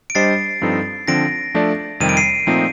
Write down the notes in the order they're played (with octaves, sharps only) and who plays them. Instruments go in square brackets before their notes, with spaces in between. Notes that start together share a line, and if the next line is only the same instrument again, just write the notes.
[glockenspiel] D7
[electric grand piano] G3 D4 G4 C5 D#5 [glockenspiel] A6 C7
[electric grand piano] G2 F3 C4 D#4 A4
[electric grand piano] D3 F3 C4 [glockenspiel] A#6 D7
[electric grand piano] F3 A3 D4 A4 D5
[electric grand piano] F2 C3 D#3 G3 [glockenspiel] D#7
[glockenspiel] D7
C7 D#7
[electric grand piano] A#2 F3 A3 C4 D#4